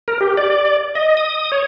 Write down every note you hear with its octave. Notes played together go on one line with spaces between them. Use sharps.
A#4
G4
D5
D#5
D#6
C#5